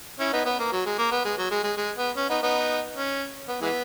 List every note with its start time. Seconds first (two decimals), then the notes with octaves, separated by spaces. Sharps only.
0.19 C#4 E4
0.33 B3 D#4
0.46 B3
0.59 A#3
0.72 F#3
0.86 G#3
0.98 A#3
1.12 B3
1.25 G#3
1.38 F#3
1.51 G#3
1.64 G#3
1.77 G#3
1.97 B3
2.17 C#4
2.30 B3 D#4
2.43 B3 D#4
2.95 C#4
3.48 B3
3.62 E3 G#3 B3